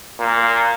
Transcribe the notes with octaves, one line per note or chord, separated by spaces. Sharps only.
A#2